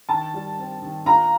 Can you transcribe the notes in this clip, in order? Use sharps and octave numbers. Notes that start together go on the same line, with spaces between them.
D#3 A5
G3
C4
D#3
A#2 A#5